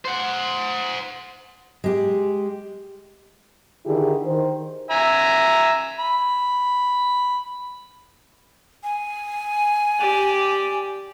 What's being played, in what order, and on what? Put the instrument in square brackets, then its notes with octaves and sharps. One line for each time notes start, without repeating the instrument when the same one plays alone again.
[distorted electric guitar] C5 F#5
[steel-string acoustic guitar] G#3 G4
[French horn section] D3 D#3 D#4 E4 G4 G#4
D#3 C5
[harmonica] E5 G#5 A#5
B5
[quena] G#5
[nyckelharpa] G4 D5